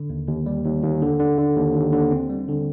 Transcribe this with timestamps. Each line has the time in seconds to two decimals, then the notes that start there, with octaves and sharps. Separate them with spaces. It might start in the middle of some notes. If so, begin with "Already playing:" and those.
Already playing: D3
0.10 D#2
0.28 D#2
0.46 G3
0.66 D#2
0.83 D#2
1.02 D3
1.19 D3
1.38 D3
1.57 D#2
1.75 D#2
1.93 D3
2.11 C4
2.29 G3
2.48 D3